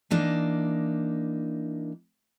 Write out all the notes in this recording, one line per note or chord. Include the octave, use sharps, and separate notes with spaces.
E3 A#3 D4 D#4